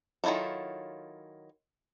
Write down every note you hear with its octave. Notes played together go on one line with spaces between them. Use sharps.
D#3 F#3 E4 F4 A4